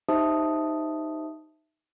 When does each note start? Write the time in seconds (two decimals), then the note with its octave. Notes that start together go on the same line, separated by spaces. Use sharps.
0.09 D#4 G4 C5 E5 A5 D#6